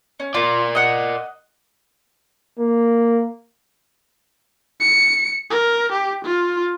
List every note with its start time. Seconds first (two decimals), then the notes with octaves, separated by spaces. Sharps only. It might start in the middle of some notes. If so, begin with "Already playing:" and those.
0.20 C#4
0.34 F4 A#4 D5
0.75 D#5 F#5
2.59 A#3
4.80 C#7
5.50 A#4
5.92 G4
6.25 F4